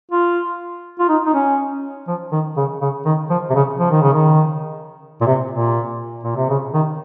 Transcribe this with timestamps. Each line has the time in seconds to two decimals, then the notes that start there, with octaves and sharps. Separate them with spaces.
0.12 F4
0.99 F4
1.09 D#4
1.26 D#4
1.34 C#4
2.08 F3
2.32 D#3
2.57 C#3
2.81 C#3
3.05 D#3
3.30 F3
3.50 C3
3.55 C#3
3.79 F3
3.91 D#3
4.02 C#3
4.14 D#3
5.21 A#2
5.27 C3
5.51 A#2
6.23 A#2
6.36 C3
6.49 C#3
6.74 D#3